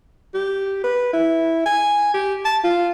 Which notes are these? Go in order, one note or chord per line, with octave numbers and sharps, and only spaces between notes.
G4
B4
E4
G#5
G4
A5
F4